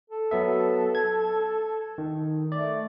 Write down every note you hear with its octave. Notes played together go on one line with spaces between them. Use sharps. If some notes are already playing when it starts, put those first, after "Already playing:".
A4
F#3 B3 E5
G#6
D#3
A3 D5